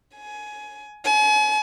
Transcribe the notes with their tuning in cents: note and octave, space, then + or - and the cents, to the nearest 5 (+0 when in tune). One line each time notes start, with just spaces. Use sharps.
G#5 +20
G#5 +40